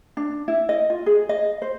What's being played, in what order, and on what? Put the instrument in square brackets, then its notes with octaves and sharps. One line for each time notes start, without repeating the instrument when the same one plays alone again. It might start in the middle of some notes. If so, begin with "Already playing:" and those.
[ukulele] D4
E4
D#5
F4
G#4
D#5
C5